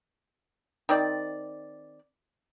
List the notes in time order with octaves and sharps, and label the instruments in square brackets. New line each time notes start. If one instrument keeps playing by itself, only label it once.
[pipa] D#3 C4 D5